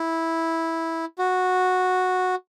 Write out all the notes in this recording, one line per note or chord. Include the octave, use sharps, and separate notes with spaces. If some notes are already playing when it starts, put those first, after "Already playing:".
Already playing: E4
F#4